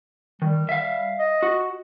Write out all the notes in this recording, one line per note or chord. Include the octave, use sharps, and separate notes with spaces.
D#3 G3
E5 F5
D#5
F#4